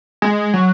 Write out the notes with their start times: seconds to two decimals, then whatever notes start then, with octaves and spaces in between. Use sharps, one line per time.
0.22 G#3
0.54 F#3